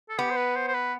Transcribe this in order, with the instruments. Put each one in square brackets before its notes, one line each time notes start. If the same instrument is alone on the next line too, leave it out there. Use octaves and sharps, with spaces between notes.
[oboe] A4
[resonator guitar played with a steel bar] B3 [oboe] G4
[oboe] C5
B4
C5
C5
B4